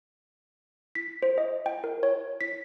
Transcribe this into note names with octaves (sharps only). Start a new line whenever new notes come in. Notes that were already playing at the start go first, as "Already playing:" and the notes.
B6
C5
D#5
G5
A#4
C#5
B6